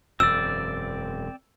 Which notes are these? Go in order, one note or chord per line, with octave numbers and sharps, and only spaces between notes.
E1 F#2 C4 D5 E6